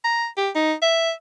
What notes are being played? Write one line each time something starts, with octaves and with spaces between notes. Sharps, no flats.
A#5
G4
D#4
E5